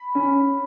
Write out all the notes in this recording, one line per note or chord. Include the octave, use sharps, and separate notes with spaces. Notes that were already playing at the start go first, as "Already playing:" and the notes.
Already playing: B5
C#4